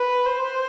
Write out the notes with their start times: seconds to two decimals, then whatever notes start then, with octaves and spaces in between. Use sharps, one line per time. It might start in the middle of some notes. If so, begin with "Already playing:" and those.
Already playing: B4
0.26 C5